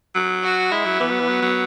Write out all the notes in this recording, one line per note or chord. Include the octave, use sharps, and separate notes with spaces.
F#3
F#4
G#3 E4
F#3
E3 B3
F#3
E3
F#3
F#3